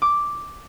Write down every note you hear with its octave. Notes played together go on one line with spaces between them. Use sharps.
D6